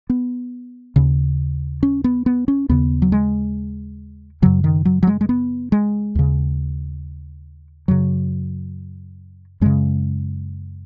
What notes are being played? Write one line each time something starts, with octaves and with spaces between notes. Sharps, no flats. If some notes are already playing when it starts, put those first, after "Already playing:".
B3
D#2 C#3
C#4
B3
B3
C#4
D#2 C#3 B3
F#3
G#3
F#2 C#3 F#3
D#3
F#3
F#3
G#3
G#3
B3
G#3
D#2 C#3
F#2 C#3 F#3
F#2 C#3 G#3